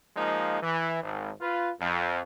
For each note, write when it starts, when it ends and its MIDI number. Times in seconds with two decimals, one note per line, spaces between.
0.16 0.57 53
0.16 0.57 56
0.16 0.57 58
0.16 0.57 63
0.62 1.02 52
1.02 1.30 32
1.41 1.71 65
1.41 1.71 71
1.80 2.21 41